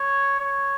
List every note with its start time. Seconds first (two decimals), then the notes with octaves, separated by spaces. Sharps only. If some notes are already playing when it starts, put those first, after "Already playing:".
Already playing: C#5
0.39 C#5